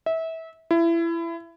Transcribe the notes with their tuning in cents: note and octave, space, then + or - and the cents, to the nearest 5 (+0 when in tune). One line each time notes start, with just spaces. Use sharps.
E5 -25
E4 +25